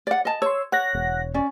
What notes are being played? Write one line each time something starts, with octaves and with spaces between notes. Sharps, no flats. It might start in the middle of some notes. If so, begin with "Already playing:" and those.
D5 F#5
D#5 A5
C#5 C6 E6
C#5 F#5 F#6 A#6
E1
C#4 D5